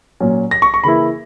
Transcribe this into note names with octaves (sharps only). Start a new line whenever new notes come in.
A#2 F#3 C#4
A#6
C#6
C#6
C#3 E3 A#3 E4 B5